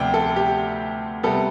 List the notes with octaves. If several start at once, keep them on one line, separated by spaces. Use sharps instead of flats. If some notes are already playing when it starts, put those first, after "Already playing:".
Already playing: D2 C3 F3 B3 D5 G5
A4
G4
C3 G3 B3 A4